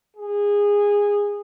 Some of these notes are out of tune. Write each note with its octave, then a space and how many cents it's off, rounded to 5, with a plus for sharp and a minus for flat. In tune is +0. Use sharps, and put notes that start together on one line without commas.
G#4 -20